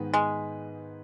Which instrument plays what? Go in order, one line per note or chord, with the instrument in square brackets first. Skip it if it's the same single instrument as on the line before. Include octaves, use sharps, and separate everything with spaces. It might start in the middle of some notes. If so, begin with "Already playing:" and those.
Already playing: [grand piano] G#2 D#3 B3 G#4 B4
[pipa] G#3